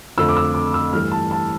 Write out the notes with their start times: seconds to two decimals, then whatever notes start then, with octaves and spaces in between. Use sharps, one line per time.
0.17 F2 D3 A3 E6
0.29 D6
0.37 E6
0.55 D6
0.74 E6
0.93 G2 E3 A3 F6
1.12 A5
1.31 A5